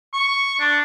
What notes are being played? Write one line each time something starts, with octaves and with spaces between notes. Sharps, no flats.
C#6
D4